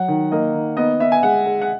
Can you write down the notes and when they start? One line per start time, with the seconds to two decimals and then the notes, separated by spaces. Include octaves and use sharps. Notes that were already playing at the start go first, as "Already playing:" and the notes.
Already playing: F#3 F#5
0.08 D#3
0.32 A#3 D#5
0.54 D#3
0.77 B3 D#5
1.00 B3 E5
1.12 G#5
1.23 G#3 F#5
1.46 G#3
1.61 F#5